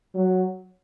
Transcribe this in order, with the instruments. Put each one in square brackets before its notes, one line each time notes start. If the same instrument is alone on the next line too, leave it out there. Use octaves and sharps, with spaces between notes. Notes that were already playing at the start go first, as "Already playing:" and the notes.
[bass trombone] F#3